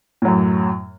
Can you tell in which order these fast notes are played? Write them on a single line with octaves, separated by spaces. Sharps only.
A2 F#3 F#2